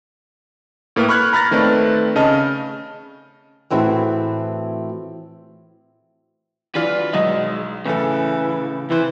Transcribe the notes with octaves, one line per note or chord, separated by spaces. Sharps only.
A2 A#3 B4 F6
B5 C#6 F6 F#6 G#6
A#5 B5 F6 F#6 A6 A#6
D#3 A3 C4 B4 D5
C#3 D#5 A5 F6
A2 E3 C4 E4 F#4 G#4
E3 F#3 D4 F4 B4
B1 G#3 D#5
A2 C#3 E3 A4
C3 E3 C5